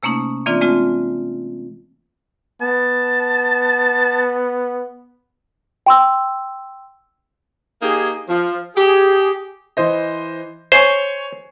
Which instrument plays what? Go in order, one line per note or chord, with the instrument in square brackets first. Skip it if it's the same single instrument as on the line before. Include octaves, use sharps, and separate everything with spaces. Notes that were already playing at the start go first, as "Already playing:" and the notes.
[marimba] C3 A3 A#3 C#4 D#4
E3 A#3 C4 D4 F4 D5
G#3 A3 C4 F4
[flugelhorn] B3 [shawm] A5
[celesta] G5 C6 E6
[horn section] A#3 D#4 G4 G#4
F3
G4 G#4
[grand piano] E3 C5 D#5
[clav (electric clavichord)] C5 [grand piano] C#5 G#5 C#6